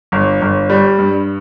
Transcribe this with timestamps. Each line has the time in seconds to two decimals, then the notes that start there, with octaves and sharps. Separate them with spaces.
0.12 G1
0.42 G1
0.70 G3
0.99 G2